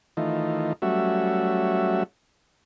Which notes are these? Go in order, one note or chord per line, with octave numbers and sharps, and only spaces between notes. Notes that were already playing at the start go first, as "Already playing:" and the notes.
D#3 E3 A3 D#4 F4
F#3 G3 A3 C#4 F#4 E5